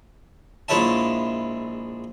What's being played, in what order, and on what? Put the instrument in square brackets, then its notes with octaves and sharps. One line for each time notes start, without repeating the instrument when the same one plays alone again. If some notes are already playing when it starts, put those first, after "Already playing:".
[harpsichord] A#1 G#3 E4 C#5 E5 A5